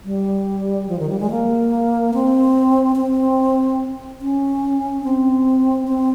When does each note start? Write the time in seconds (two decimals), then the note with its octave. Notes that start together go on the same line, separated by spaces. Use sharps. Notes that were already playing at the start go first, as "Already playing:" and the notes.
0.05 G3
0.89 F3
0.99 D#3
1.09 G3
1.20 G#3
1.30 A#3
2.14 C4
2.96 C4
4.22 C#4
5.04 C4
5.88 C4